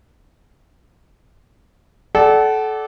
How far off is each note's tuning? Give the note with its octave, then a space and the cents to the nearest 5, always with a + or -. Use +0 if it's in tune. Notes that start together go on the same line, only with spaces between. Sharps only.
A4 -25 D5 +0 F#5 +25